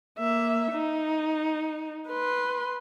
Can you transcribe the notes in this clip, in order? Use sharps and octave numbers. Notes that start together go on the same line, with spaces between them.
A#3 E5
D#4
B4 C6